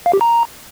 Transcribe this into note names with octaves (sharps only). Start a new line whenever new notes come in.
F5
G4
A#5